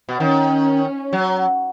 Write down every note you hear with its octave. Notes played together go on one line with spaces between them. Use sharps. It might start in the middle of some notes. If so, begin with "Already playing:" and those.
B2
D#3 C#4
F#3